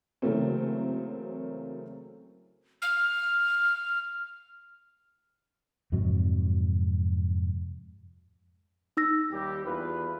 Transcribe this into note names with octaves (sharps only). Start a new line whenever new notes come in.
C#3 E3 F#3 A3 A#3 C4
F6
F2 G#2 C3 F#3
D#4 E6 A#6
D#2 G3 G4
E2 F4 B4